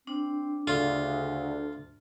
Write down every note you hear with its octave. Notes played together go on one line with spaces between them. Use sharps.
C4 D4
D2 C#3 F4